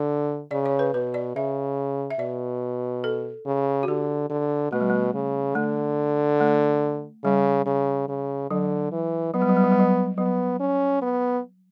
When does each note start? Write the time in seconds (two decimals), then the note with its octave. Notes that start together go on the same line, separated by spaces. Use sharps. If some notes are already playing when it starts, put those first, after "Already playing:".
Already playing: D3
0.51 C#3 D5
0.66 C#5
0.79 B4
0.94 B2 B4
1.14 D5
1.35 C#3 E5
2.10 E5
2.19 B2 D5
3.04 A4
3.46 C#3
3.83 F#4
3.88 D3 G4
4.30 D3
4.72 B2 A3
4.80 G3
4.90 A3
5.14 C#3
5.55 D3 A3
6.40 A3
7.24 C#3 G3
7.66 C#3
8.09 C#3
8.51 D3 F#3
8.92 E3
9.34 F#3 B3
9.42 G3
9.49 F#3
9.56 G3
9.64 F#3
9.72 G3
9.80 F#3
10.18 F#3 B3
10.60 C#4
11.02 B3